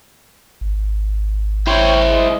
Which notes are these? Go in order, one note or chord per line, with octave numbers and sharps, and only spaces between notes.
G#1
E4 C5 C#5 G5
G#3